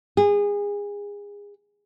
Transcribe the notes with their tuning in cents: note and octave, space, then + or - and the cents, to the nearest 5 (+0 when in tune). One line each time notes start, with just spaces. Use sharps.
G#4 -25